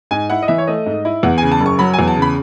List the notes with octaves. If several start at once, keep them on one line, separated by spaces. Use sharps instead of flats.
G#2 G#5
E4 F#5
D#5
E3 E5
C#5
A3 D#5
G#2
E4
E2 F#5
C#3 G#5
A5
F#1
C#6
F#3 B5
G#5
E2
A5
C#3
B5